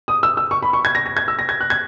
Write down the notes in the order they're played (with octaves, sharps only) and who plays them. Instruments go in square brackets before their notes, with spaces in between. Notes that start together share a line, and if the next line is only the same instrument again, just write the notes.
[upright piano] D#6
E6
E6
C#6
B5
C#6
G#6
A#6
A#6
G#6
E6
A#6
G#6
F#6
G#6